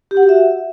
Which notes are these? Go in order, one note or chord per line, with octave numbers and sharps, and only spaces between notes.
G4
F#5
F#4
E5